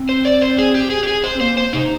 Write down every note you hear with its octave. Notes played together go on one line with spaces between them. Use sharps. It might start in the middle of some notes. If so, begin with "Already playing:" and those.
Already playing: C4
C5
D5
C5
G#4
G4
G#4
G4
G#4
C5
C4
A#3 C5
C5
C3 D#4